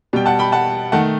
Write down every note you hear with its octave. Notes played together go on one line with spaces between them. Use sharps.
B2 G3 G5
F#5 A5
G5 B5
F#5 A5
D#3 A3 F#5 A5